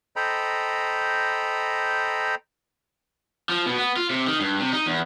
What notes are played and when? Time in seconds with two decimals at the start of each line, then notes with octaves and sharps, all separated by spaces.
0.16 A4 C5 D#5 G5 A#5 B5
3.49 F3
3.67 B2
3.78 B3
3.96 F4
4.10 C3
4.27 D#3
4.40 G2
4.60 C3
4.73 D#4
4.86 E2